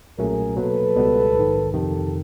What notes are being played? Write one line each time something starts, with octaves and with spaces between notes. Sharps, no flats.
B1 A#2 F#3 A3 C#4 G#4 A#4
B2 F#3 A#3 A4 B4
C#2 B2 G3 B3
A#1 G#2 D#3
F2 C3 D#3 G4 A4